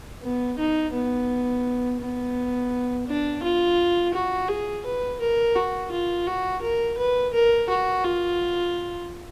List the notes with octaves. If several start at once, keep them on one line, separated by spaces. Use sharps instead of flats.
B3
D#4
B3
B3
D4
F4
F#4
G#4
B4
A#4
F#4
F4
F#4
A#4
B4
A#4
F#4
F4